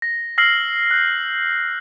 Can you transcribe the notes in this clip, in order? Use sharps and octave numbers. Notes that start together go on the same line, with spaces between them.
A#6
E6 F6 A#6 C7 F#7
F#6 G6